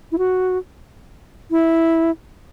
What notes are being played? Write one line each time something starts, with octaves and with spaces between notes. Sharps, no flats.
E4
F#4
E4